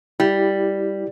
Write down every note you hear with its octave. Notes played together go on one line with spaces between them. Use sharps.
G3 E4 G4